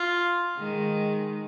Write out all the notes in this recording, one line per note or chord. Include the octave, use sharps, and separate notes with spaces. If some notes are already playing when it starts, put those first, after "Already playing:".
Already playing: F4
D#3 G#3